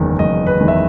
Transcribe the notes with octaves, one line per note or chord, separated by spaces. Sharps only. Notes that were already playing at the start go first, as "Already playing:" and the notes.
Already playing: F#1 E2 D#3
F#1 D#5
B4
E2 D#3
E5